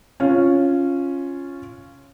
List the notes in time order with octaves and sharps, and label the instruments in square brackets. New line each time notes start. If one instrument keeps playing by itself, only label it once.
[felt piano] C#4 F4